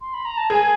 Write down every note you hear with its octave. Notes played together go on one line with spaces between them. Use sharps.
C6
B5
A#5
A5
G#4 G#5